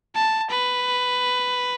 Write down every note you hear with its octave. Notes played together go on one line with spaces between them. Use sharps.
A5
B4